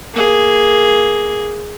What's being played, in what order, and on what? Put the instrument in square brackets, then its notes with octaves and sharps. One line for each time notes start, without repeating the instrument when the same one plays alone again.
[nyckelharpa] A#3 G#4